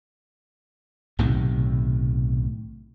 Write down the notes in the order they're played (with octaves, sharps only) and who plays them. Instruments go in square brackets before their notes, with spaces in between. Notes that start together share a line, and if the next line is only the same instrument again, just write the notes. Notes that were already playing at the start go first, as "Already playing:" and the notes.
[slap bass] B1 A2 C3 D#3